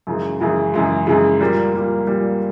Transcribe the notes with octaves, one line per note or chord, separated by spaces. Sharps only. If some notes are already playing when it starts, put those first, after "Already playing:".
F#2 C#3 E3 G#3
F#2 C#3 E3 G#3
F#2 C#3 E3 G#3
F#2 C#3 E3 G#3
A#2 G3 A#3
A#2 G3 A#3
A#2 G3 A#3